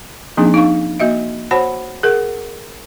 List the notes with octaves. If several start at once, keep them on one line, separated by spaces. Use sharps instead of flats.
F3 A#3 C4 D4 D#4 G#4
D#4 F5 C#6
A#3 F#4 D#5 E5
F#4 C5 C#5 F#5 A5 B5
G#4 A#4 F#5